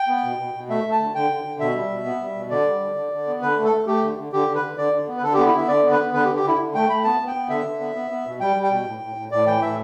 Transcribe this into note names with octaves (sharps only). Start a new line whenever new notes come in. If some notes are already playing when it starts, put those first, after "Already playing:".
Already playing: G5
B3
B2
B2
B2
A3 E5
A3
A5
D3
D3 G5
D3
D3
B2 E5
G3
B2
B3
G3
B2
D3 D5
G3
D3
D3
D3
B3
D3 B4
A3
A4
A3
A3 G4
D3
D3
D3 G4
D3
B4
D3
D3 D5
D3
B3
B4
D3 A4
B3 G4
E4
D3 E5
D3 D5
B3
B4
B3
D3 B4
G4
D3
G4
D3 E4
D3
A3 G5
A3 B5
B3 A5
B3
G5
B3
D3 E5
D3
B3
B3
B3
B2
G3 G5
G3
G5
B2
A2
A2
A2
A2 D5
E3 G5
A2 E5